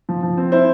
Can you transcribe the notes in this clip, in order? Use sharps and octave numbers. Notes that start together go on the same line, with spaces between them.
F3
F3
C4
E4 C5